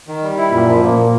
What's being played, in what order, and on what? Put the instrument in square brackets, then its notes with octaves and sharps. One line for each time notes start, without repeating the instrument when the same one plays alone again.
[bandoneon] D#3
G3
E4
[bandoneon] F#2 [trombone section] A#2
[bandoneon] F3
[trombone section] A#2 [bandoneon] A#3
[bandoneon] A#3